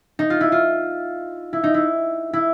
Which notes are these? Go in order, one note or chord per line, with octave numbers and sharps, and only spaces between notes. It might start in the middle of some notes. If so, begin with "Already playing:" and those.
D#4
F4
E4
F4
E4
D#4
E4
E4